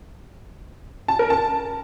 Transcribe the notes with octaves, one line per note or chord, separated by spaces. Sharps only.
A5
A#4
A5